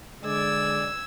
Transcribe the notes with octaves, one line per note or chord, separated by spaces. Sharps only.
D3 G#3 D5 E6 G#6